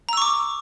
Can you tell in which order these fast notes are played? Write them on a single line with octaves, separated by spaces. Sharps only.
A#5 E6 C#6 D6